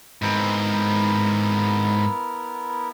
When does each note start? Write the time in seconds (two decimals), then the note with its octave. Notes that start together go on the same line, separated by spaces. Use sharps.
0.22 G#2 B3 C4 E4 A#4